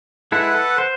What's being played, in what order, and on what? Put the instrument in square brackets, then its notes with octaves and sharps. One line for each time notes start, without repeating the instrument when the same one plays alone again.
[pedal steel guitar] G#3 E4 A4 [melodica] B4 F#5
[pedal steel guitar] A4
C5